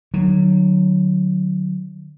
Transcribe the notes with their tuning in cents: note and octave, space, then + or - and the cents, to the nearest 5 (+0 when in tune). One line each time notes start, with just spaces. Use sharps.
D3 +40 F#3 +0